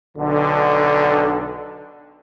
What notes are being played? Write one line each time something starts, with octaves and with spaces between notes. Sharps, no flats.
B1 D3